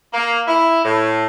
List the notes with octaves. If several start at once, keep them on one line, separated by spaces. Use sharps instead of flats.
A#3
E4
A2